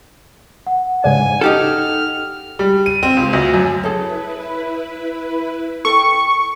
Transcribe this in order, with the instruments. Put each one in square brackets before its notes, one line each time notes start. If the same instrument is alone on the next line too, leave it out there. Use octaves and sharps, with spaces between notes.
[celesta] F#5
[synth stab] G#2 C#3 D4 [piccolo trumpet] G#5
[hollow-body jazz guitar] D#4 G4 A4 [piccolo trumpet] F6
[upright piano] G3
D#7
C4
C#2
D2
F#2
[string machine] E4 B4 [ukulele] G#4 A4 C#5
[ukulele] A4 G5 [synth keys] C#6